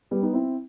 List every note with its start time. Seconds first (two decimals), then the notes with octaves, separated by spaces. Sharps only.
0.11 G3 B3
0.22 B3 D#4
0.33 C4 E4